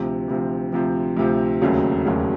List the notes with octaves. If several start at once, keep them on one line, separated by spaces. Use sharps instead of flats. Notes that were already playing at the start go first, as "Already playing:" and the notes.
Already playing: D2 C3 F3
D2 C3 F3
D2 C3 F3
D2 C3 F3
E1 D#2 C#3 F#3 A3
E1 D#2 C#3 F#3 A3